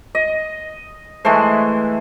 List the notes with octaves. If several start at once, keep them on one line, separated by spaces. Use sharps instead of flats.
D#5
E3 G#3 A3 C5